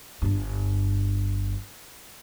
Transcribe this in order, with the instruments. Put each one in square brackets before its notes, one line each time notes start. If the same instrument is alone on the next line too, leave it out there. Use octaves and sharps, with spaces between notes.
[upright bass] G1 G2